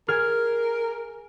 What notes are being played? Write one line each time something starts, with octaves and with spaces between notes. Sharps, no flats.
G#4 A#4 F6 G#6